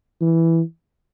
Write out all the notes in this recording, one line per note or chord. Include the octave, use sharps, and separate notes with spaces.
E3